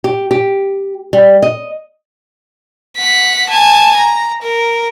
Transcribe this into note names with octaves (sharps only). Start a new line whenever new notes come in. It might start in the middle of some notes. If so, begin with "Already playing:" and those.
G4
G4
G3
D#5
F#5 B6
G#5 A5
A#5
A#4